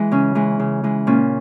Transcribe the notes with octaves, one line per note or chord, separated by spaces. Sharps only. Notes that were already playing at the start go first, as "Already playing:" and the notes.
Already playing: E3 G#3
C#3 C#4
E3 G#3
C#3
E3 G#3
A#2 C#4